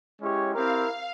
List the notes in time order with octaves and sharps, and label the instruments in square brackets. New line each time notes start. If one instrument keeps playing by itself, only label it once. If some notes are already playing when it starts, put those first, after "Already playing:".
[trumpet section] G#3 C#4 E4 G4 C#5
[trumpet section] C4 E4 G4 A#4 [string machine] F5